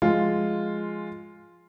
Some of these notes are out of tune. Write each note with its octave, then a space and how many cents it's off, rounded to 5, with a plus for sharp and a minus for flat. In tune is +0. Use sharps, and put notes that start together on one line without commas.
F3 +0 G#3 +0 F4 +0